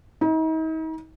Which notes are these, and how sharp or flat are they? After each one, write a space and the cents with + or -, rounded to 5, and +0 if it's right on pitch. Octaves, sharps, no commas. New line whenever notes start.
D#4 +40